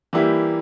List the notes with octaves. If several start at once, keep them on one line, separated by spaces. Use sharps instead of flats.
E3 G3 A#3 E4 G4